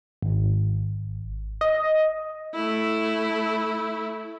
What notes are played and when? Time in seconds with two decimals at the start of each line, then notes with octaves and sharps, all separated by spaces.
0.22 G#1
1.61 D#5
2.54 A3 E4